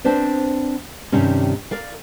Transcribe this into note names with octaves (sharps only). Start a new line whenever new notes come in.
C4 D4 B4 C5 D5
G2 C3 D#3 G3 C#4
A#4 D5 F5